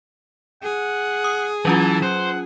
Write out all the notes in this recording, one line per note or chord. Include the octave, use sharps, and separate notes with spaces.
G#4 F#5
D#6
E3 F#3 C#4 F4 A5
C5 F#5